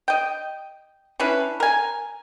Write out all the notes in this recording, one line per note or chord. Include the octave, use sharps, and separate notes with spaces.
D#5 G5
C#4 D4 E4 B4
A#4 G#5